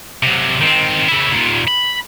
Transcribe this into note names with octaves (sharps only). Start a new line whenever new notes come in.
C3 F#3
D#3 C4
C#3 E4
D#2 A#2
B5